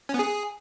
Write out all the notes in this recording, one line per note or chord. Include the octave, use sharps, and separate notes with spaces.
C#4
B3
G#4